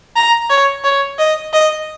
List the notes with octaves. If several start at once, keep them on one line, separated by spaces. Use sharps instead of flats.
A#5
C#5
C#5
D#5
D#5